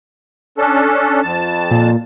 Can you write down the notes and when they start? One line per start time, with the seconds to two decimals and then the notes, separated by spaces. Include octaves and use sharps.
0.58 C#4 D4 A4
1.22 F2 A5
1.71 A#2